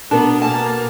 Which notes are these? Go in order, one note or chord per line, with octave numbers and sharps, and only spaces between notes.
B2 B3 D4 A4 A#4 A5
A#3 G#5 A5